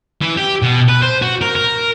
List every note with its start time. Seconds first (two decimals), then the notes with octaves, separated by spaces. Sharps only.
0.22 E3
0.37 G4
0.63 B2
0.89 B4
1.02 C5
1.22 F#4
1.41 A#4
1.55 A#4